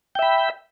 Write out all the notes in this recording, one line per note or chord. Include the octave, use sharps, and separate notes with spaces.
E5 G5 B5